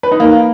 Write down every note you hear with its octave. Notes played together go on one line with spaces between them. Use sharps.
B4
D#4
A#3